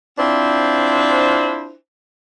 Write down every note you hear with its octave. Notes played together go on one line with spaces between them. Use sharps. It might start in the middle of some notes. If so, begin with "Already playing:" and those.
C4 D4 E4 F4 C5